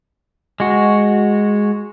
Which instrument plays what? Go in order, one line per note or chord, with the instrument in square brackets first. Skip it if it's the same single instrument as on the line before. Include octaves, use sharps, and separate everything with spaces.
[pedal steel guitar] G#3 F#4